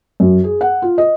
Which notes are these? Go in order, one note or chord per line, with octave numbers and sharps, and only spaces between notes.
F#2
G#4
F#5
F4
D#5